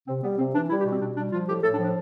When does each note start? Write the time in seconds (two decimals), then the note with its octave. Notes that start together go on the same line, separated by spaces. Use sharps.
0.08 C3 C4
0.23 G3 B3
0.39 C3 C4
0.54 E3 D4
0.70 G3 E4
0.80 G4
0.85 B2
0.91 C4
1.01 B2 D4
1.16 G3 D4
1.32 F3 F4
1.48 A2 G4
1.63 A2 A4
1.74 D4
1.79 F3
1.84 D4